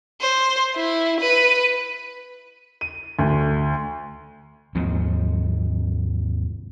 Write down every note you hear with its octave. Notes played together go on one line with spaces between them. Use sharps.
C5
E4
B4
D#7
D2
D#2 G#2 F3 C4